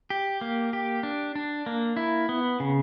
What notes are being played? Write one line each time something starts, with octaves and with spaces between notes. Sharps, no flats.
G4
A#3
G4
D4
D4
A#3
E4
B3
C#3